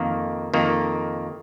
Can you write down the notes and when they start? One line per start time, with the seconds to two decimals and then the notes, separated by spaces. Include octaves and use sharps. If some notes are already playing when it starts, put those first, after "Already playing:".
Already playing: F2 D#3 A#3
0.54 F2 D#3 A#3